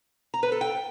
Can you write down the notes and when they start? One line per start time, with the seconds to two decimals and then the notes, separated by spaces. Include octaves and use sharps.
0.34 A#5
0.43 B4
0.52 A4
0.61 G5